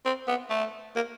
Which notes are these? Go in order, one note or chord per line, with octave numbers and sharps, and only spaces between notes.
C4
B3
A3
A#3